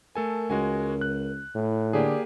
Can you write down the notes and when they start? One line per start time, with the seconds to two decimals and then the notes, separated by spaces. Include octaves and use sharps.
0.15 A3 A4 A#4 G#5
0.50 C#2 G#3 F#4 G#5
1.01 F#6
1.55 A2 E4
1.93 D3 A#3 G4 G#4 D5